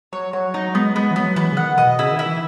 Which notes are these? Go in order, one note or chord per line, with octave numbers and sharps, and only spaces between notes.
F#3 C#5
F#3 C#5
F#3 D#4
F#3
G#3 B3
G#3 B3
E3
F#3 B3
E3 B3
C#3
D#3 F#5
B2 D#5
C#3 E4
D#3
E4
E3